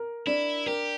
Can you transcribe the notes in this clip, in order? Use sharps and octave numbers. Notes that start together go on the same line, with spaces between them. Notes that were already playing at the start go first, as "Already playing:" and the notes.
Already playing: A#4
D4 E4
G4 A#4